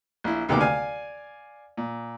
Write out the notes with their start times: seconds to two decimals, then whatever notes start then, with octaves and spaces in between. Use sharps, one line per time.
0.24 A#1 E4
0.49 D2 C3 D#3 A#3 B3 D6
0.61 D5 F5 G#5
1.77 A#2